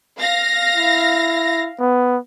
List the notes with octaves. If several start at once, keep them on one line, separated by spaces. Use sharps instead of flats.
F5 A#6
E4
B3